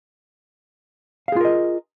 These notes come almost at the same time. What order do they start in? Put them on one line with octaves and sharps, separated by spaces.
F5 G#4 F4 A#4 D#5